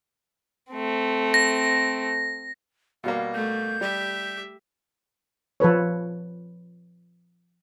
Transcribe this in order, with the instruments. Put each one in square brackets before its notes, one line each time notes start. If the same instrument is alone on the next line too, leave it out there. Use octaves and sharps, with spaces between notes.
[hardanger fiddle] A3 C4
[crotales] A#6
[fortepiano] B2 G3 A#3 [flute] F5
[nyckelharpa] A3 [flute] G6
[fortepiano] G3 [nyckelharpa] G4 E5
[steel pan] F3 A4 B4 C#5